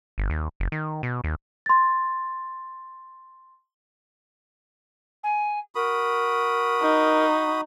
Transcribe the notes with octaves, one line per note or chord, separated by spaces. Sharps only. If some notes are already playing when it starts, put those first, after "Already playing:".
G1
D#2
F#1
D#3
B2
D#2
C6 A6
G#5
F#4 A#4 B5 D#6
D#4